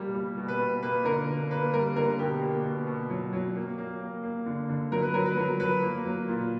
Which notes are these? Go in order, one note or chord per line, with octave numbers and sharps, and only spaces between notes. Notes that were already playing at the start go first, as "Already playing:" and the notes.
Already playing: B2 G3 A#3 G4
G3
B2
B4
B2
A#3 B4
D3 A#4
A#3
A#3 B4
G3 A#4
D3 A#4
B2 G4
A#3
B2
B2
F#3
F#3
A#3
A#3
A#3
A#3
D3
D3
F#3 A#4
B4
F#3 A#4
B4
F#3
F#3 B4
A#3
F#3
A#2